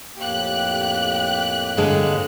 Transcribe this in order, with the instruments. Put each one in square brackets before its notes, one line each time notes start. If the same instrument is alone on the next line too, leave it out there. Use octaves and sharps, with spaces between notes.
[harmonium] F2 A2 A#3 [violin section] G4 F#6
[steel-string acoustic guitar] G2 D3 G#3